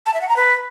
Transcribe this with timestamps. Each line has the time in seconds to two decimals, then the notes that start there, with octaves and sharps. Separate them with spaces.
0.06 A5
0.14 E5
0.21 F#5
0.29 A#5
0.36 B4